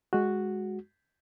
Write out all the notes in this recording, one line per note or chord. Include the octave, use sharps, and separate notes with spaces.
G#3 F#4